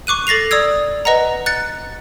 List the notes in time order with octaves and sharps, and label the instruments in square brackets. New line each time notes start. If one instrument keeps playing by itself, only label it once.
[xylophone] C#6 D6 F#6 D#7
A4 A6 A#6 C7 F7
D5 D#6 E6 G#6
B4 D#5 F#5 A#5
F#6 A6 C#7